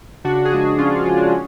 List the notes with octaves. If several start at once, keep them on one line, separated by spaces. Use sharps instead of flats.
C#3 D4 F#4
G#4
F3 G#3 D4 F#4
C#3 C#4 F4
F3 G#3 F4
D4
C#4